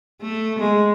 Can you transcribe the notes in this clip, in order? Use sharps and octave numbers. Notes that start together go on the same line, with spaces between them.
A3
G#3